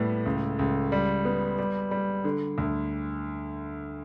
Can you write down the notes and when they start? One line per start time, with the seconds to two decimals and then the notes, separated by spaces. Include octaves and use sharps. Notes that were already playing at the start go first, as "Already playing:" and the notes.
Already playing: A2 G3 B3
0.26 C#2
0.59 C#2
0.92 G3
1.25 B3
1.58 G3
1.91 G3
2.24 D3
2.58 D2